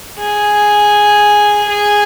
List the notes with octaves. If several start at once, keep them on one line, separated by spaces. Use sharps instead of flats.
G#4
G#4